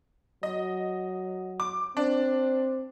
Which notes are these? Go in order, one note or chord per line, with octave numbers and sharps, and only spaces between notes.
F#3 D#5
D6
C4 D4